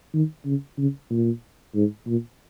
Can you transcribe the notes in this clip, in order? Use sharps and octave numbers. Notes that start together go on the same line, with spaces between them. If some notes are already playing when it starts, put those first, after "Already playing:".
D#3
C#3
C#3
A#2
G#2
A#2